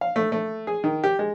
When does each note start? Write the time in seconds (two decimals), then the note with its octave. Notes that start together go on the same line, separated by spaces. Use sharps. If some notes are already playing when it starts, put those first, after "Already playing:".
0.01 F5
0.16 A3
0.32 A3
0.67 G#4
0.84 D#3
1.04 G4
1.19 G#3